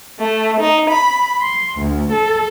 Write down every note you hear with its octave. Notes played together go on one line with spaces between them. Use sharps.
A3
D#4
B5
C6
D2
A4